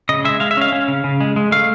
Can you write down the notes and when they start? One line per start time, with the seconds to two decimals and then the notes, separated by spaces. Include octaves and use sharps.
0.09 C#3 D#5
0.25 G#3 E5
0.40 G#3 F5
0.51 E5
0.57 C#4 F5
0.72 C#4
0.88 C#3
1.04 C#3
1.21 G#3
1.36 G#3
1.52 A3 F5